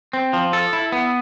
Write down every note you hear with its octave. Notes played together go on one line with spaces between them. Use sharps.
C4
F3
A4
E4
B3